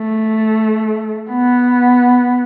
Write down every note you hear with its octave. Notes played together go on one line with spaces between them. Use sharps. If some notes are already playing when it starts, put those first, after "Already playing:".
Already playing: A3
B3